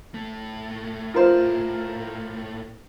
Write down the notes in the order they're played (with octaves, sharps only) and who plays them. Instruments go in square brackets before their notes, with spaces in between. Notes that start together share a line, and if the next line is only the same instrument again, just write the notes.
[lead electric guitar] A2 A3
[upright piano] F4 A#4 C5